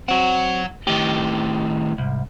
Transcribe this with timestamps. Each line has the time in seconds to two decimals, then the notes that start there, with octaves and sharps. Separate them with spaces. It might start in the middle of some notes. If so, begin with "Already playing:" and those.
0.08 F#3 C4 F#4 F#5
0.87 A2 D#3 G4
1.98 C2 G#2